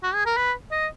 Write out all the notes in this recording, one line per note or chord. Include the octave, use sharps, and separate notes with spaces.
F#4
G#4
A#4
B4
D#5